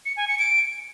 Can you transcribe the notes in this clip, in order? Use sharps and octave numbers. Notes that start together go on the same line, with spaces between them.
C#7
G#5
C#7
D7